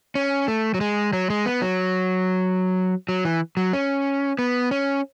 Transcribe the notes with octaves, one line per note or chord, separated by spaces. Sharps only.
C#4
A3
F#3
G#3
F#3
G#3
B3
F#3
F#3
E3
F#3
C#4
B3
C#4